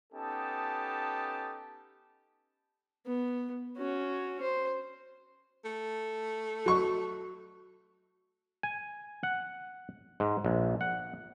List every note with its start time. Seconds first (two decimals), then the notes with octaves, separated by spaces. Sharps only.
0.13 B3 C#4 D#4 G4 A4 A5
3.06 B3
3.77 C#4 F#4
4.41 C5
5.65 A3
6.66 F#3 C#6
8.63 G#5
9.23 F#5
10.20 G#2
10.45 A#1
10.81 F#5